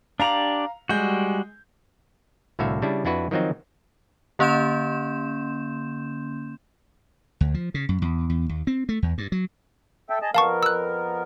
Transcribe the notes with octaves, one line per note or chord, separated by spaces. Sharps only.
D4 G4 D5 F5 A#5 F7
G3 G#3 F#4 G6
C2 A2 D3 F#4 E5 F5
C#3 G3 D4 E4
F2 D4 E4 F#4 B4
D#3 F3 F#3 C4 D#4
D3 A#3 C#4 C6 G6 E7
D2
F3
C#3
F#2
E2
E2
D#2
C4
A3
E2
G2
F#3
A4 E5 G5
G#4 D#5 A5
F2 B3 A#4 F5 A5 C#6
E6 F#6